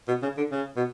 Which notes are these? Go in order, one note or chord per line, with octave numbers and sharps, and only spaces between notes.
B2
C#3
D3
C#3
B2